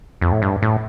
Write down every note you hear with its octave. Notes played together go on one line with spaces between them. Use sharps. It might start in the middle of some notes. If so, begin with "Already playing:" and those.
F2
A2
G2
A2